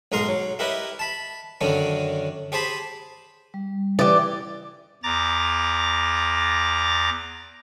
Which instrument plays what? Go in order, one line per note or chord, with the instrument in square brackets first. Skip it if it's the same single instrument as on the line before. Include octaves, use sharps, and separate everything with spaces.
[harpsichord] B1 G#2 D#4 A#4 A#5 C6
F#3
E4 G4 A#4 B4 D#5
A5 B5
F#2 D3 D#3 C#4 D4
G4 G#4 C5 A5 B5
[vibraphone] G3
[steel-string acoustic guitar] E3 [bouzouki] G4 D5
[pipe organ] E2 A#5 D6 A6 A#6